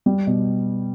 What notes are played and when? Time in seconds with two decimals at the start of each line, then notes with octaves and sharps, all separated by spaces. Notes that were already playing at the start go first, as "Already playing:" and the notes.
0.06 G3
0.27 B2